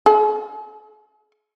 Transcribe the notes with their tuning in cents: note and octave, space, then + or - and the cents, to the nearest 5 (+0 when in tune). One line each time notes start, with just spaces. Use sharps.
G#4 +40